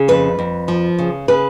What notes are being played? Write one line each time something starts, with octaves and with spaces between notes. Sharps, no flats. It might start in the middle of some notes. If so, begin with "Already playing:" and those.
Already playing: C#3
F2 B4
F2
F3
C#3
C#3 B4